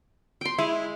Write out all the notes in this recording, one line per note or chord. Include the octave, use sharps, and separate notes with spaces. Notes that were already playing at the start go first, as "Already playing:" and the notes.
G5 C6
G#3 E4